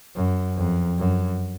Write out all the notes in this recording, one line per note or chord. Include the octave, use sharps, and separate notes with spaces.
F#2
F2
F#2